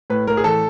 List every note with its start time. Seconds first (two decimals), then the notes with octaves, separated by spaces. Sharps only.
0.10 A2 B4
0.27 A2 A#4
0.37 G#4
0.44 E3 A4